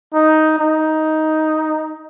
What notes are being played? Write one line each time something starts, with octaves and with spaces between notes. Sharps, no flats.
D#4
D#4